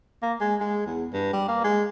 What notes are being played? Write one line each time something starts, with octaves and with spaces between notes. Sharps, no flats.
A#3
G#3
G#3
E2
G2
G3
A#3
G#3